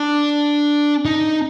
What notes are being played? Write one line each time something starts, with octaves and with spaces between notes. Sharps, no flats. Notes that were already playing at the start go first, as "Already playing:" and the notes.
Already playing: D4
D#4